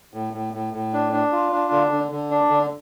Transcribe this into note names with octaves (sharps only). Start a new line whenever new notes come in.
A2
A2
A2
A2
D4
D4
F4
D4
D3
D3
D3
D4
D3